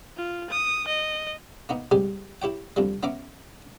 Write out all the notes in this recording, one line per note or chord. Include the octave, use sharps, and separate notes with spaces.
F4
D#6
D#5
A#3 B3 D#4
G#2 C3 G3 G4 G#5
E4 G4 C#5 G5
D2 C3 F3 G3
B3 C#4 E5 A#5 D6